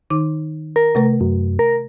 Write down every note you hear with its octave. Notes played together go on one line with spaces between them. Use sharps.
D#3 D#4 D6
A#4
C3 A3 B4
F#2
A#4